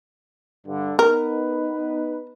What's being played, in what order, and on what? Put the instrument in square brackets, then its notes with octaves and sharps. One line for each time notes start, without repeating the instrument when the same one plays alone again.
[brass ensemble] G2 D3
[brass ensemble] B3 D#4 B4 [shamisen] A#4